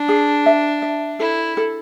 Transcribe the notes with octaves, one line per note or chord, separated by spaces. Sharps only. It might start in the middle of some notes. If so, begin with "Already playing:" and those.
Already playing: D4
G#4
E5
E5
E4 A4
A4